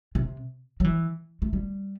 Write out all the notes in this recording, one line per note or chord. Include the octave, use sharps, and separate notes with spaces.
C3
F#3
E3
A3
G3